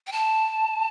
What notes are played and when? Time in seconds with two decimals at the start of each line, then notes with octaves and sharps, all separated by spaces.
0.07 G5
0.12 A5